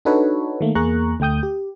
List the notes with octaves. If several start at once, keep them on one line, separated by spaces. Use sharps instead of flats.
D4 D#4 F#4 A4 B4 C#5
D#3 A3 A#3
E2 A#3 G#4 A#5 C#6 F#6
D2 A3 G5 D#6 G6
G4